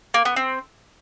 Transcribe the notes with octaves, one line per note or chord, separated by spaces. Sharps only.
A#3
B3
C4